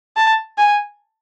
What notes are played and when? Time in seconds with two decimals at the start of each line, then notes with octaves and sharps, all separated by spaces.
0.17 A5
0.58 G#5